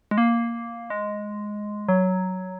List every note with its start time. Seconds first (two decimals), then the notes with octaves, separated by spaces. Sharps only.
0.11 G#3
0.18 A#3
0.90 G#3
1.89 F#3